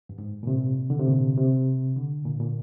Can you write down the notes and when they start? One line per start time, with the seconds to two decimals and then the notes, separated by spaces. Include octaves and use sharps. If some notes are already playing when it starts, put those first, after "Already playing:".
0.09 G2
0.18 G#2
0.43 A#2
0.47 C3
0.90 D3
0.99 C3
1.07 A#2
1.37 C3
1.96 D3
2.25 A#2
2.40 A#2